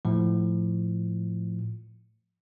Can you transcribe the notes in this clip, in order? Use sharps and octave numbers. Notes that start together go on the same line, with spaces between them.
A2 F3